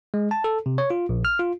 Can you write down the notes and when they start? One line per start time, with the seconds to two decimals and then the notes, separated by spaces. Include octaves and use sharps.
0.14 G#3
0.31 A5
0.44 A4
0.66 C3
0.78 C#5
0.90 F4
1.09 A#1
1.25 F6
1.39 F4